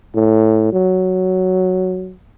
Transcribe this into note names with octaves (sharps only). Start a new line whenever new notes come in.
A2
F#3